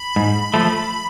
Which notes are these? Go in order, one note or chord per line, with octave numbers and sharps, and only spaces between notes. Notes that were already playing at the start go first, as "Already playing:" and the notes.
Already playing: B5
G#2
F3 A3